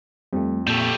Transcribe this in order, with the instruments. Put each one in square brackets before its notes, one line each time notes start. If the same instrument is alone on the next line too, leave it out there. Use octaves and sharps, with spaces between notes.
[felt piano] F2 [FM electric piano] G3 A3
[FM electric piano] A#2 [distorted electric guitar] G3 A3